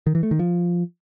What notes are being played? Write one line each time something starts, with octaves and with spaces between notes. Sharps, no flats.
D#3
E3
A3
D#3
F3